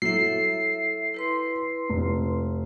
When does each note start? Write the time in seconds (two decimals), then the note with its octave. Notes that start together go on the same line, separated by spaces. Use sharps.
0.02 F#3 E4 A4 E5 C7
1.14 E4 B4 C6
1.90 F1